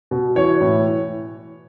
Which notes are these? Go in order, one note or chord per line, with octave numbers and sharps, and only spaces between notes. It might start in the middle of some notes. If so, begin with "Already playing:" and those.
B2
E3 C#5
A2